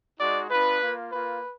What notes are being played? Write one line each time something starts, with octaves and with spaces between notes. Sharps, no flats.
G#3 D#4 F#4 D5
B3 D4 F4 B4
A#3 F4
A#3 F4 B4